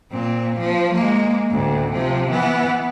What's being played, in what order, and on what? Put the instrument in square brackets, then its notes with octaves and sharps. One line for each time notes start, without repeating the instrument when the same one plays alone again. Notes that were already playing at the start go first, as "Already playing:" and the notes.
[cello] A#2 C4
F3
G#3 A#3
D2 A2
C3 F3
E3 B3